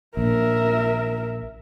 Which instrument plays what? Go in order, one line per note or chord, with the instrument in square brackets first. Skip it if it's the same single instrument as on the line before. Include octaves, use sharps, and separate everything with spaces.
[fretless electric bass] A#1 [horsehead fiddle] A#4 E5